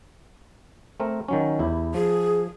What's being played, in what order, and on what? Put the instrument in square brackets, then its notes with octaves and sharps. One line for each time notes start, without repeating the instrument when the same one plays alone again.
[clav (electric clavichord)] A3 C4 A#4
D#3 F#3 C#4
E2 E4 G4
[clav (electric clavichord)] F3 [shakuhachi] G#4